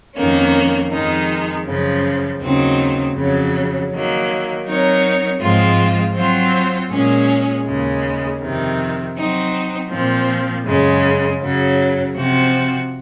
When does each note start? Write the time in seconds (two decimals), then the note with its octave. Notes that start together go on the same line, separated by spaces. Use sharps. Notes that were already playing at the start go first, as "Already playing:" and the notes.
0.14 F2 D#3 A#3 C#4
0.90 F2 D#3 G#3 D#4
1.65 F#2 C#3 F3
2.40 D#2 C#3 F#3 C4 D#4
3.15 F2 C#3 F#3
3.90 D#3 F#3 A#3
4.65 F#3 C4 D#4 A#4 C#5
5.40 G#2 F3 G#3 C4 F4
6.14 F#3 C4 F4 C5
6.90 A#2 G#3 C#4 G#4
7.64 D#2 C#3 G#3
8.39 F2 C3 D#3
9.15 F#3 C4 D#4
9.90 A#2 F3 C4
10.64 F#2 C#3 G#3
11.39 F#2 C#3 F#3
12.15 C3 F3 C4 F#4